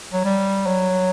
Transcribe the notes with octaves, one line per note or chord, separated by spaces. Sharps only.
F#3
G3
F#3